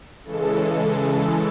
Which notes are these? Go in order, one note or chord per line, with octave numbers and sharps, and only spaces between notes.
C#3 E3 G#3 A4